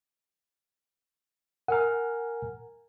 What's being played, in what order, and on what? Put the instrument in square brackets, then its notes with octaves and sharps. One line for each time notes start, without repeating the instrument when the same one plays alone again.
[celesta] A#4 G#5 A#5 [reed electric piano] F#5 F6